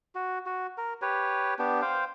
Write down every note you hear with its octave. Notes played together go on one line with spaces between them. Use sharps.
F#4
F#4
A#4
G4 B4 C#5
B3 D4 G4
C5 F5 G5